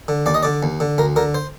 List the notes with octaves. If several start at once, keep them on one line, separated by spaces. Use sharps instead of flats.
D3
D#2 D5
D#5
D3 D5
D#2
D3
D2 A#4
D3 A#4
C5